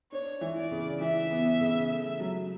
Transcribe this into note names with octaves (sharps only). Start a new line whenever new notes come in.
D4 C#5
E3
D5
C#3
E3 E5
B3
C#3
A3
F#3